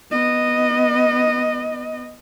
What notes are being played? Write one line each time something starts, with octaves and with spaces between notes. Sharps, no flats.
B3 D#5